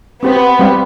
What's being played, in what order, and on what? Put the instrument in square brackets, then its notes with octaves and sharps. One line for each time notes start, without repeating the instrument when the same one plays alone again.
[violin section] B3 [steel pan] C4 G4 C5
[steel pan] G3 C4 G4 C5 F5